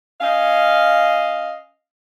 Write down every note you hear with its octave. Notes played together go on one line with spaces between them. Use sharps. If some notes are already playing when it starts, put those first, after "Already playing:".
C#4 D#5 F5